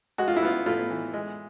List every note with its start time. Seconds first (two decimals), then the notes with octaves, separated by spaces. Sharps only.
0.18 G#3 F#4
0.28 F4
0.36 E4
0.43 B3 F4
0.66 A2 F4
0.90 E3
1.14 G#3